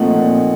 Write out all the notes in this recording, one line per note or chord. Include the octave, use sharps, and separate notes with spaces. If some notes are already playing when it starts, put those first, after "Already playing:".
Already playing: A#2 F3 A3 C4 D#4 F#5
A#2